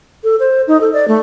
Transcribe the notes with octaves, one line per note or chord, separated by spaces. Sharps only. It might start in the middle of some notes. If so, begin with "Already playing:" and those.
A4
C5
D#4
A4
D5
A3